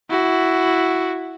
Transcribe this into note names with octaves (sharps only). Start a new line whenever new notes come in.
E4 F#4